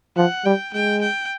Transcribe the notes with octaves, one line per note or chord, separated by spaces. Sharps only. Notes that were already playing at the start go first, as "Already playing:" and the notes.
F3 F#5
G3 G5
G#3 G5
G5